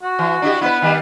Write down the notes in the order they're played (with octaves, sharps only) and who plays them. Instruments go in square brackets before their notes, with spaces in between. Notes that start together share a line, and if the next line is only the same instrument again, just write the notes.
[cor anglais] F#4
[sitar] E3
D4 E4 G4
[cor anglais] B3 [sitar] E4 B4
[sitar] D#3 G3